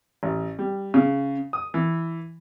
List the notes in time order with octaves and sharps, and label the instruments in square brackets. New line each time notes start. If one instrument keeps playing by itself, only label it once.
[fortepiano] A1
G3
C#3
D#6
E3